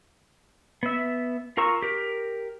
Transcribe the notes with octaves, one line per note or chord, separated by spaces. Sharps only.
B3 E5
F4 A#4 A#5 C#6 E6
G4 A#4